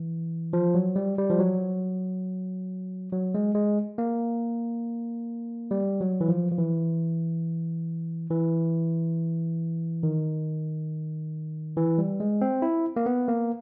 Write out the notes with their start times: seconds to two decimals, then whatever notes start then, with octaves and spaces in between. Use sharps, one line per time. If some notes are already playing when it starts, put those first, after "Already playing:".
Already playing: E3
0.53 F3
0.75 F#3
0.96 G3
1.18 G3
1.30 F3
1.39 F#3
3.13 F#3
3.34 G#3
3.55 G#3
3.98 A#3
5.71 G3
6.01 F#3
6.21 E3
6.29 F3
6.51 F3
6.58 E3
8.30 E3
10.03 D#3
11.77 E3
11.98 G3
12.20 G#3
12.41 C4
12.62 E4
12.96 A#3
13.06 B3
13.28 A#3